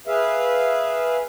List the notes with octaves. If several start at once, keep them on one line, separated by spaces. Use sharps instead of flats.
G#4 B4 E5 F5